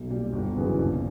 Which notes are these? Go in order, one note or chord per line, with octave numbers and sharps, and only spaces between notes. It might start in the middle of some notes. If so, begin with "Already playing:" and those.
Already playing: B1
A#2 G3
G1
F#2 C#3 E3 B3
A#1